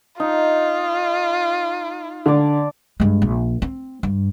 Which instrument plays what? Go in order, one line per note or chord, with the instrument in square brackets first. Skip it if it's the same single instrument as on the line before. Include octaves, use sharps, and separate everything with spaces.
[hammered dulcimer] D#4 [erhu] F4
[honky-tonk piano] D3 [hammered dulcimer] D4 D5
[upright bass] G2 G#3
A#1
C4
G2